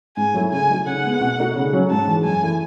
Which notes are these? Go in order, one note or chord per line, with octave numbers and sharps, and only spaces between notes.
G#2 G#5
F#3 A3 E4
C#3 G#5
F#3 A3 D#4 F#4
C#3 F#5
G#3 B3
B2
A3 D#4 F#4
C#3
F#3 C#4
G#2 A5
E3 G#3
F#2 G#5
E3 A3 E4